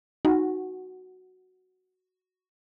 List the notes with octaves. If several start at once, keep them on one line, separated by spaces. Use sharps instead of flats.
D#4 F#4